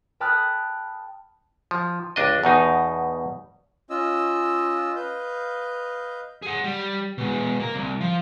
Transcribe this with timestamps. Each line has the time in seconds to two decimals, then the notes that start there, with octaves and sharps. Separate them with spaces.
0.20 G5 A5 B5 D#6 F6 F#6
1.71 F3
2.16 C#2 D4 D#5
2.43 E2 B2 D#4
3.90 C#4 F4 D#5 E6
4.96 B4 D#5 F5 G6
6.42 G#4 F#5
6.64 G3
7.18 B2 G#3
7.60 A#3
7.74 C2
8.01 F3